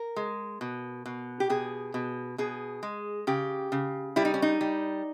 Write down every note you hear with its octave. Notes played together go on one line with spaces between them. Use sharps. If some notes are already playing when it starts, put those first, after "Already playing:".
Already playing: A#4
G#3
B2
B2
G4
B2 G#4
B2
B2 G#4
G#3
C#3 G4
C#3
G3 E4
D#4
C#4
D#4
G3